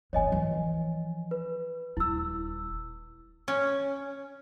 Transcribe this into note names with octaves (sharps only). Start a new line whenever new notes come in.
E3 C4 C#5 D#5 G#5
E3 F3
B4
D#1 E4 E6
C#4